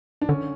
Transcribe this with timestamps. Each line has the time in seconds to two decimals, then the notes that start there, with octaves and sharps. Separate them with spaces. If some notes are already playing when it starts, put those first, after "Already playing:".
0.21 D4
0.29 D3 C#4